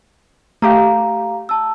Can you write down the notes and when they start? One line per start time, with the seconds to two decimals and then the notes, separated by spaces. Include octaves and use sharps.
0.62 A3 G4 F5 A#5
1.49 A5 E6